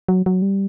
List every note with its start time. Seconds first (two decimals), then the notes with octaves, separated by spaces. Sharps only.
0.08 F#3
0.26 F#3
0.42 G3